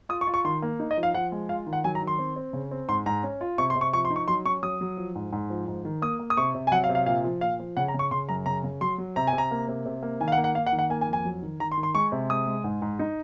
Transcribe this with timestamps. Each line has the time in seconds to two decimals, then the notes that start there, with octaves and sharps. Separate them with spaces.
0.09 F4 D#6
0.21 C#6
0.27 F4
0.34 C#6
0.45 D#3 C6
0.62 A#3
0.80 D#4
0.91 D#5
0.97 F3
1.03 F5
1.14 F3 F#5
1.32 G#3
1.49 F4 F5
1.66 D#3
1.73 F#5
1.84 F#3 G#5
1.95 A#5
2.02 D#3
2.07 C6
2.19 C4
2.36 C4
2.53 C#3
2.71 C4
2.89 G#2 C6
3.06 G#2 A#5
3.23 C#4
3.41 F4
3.58 C3 C#6
3.70 C6
3.76 C3
3.81 C#6
3.93 F3 C#6
4.05 C6
4.10 D#4
4.16 C#6
4.28 F#3 C6
4.45 C#4 C#6
4.63 F#3 D#6
4.81 F#3
4.97 F3
5.15 G#2
5.32 G#2
5.50 F3
5.68 G#2
5.85 D#3
6.02 A#3 D#6
6.20 A#3
6.30 D#6
6.37 C3 C#6
6.55 C3
6.67 G#5
6.72 F#3 F#5
6.84 F5
6.89 C3
6.95 F5
7.06 A#2 F5
7.24 F3
7.41 A#2 F5
7.60 F3
7.77 C#3 F#5
7.88 A#5
7.94 C#3
7.99 C#6
8.11 C#3 C6
8.29 F#2 A#5
8.46 C#3 A#5
8.64 C#3
8.81 F#3 C6
8.98 F#3
9.16 C3 A#5
9.27 G#5
9.33 C3
9.38 A#5
9.51 A#3
9.68 C3
9.85 C3
10.03 A#3
10.21 D#3 G#5
10.28 F5
10.32 F#5
10.38 A#3
10.44 F#5
10.55 A#3 F5
10.66 F#5
10.73 D#3
10.79 F#5
10.90 A#3 G#5
11.01 G#5
11.07 F2
11.13 G#5
11.25 F#3
11.42 D#3
11.60 D#3 A#5
11.72 C6
11.77 D#3
11.83 C6
11.95 G#3 C#6
12.12 C3
12.29 G#3 D#6
12.47 G#3
12.64 G#2
12.82 G#2
12.99 D#4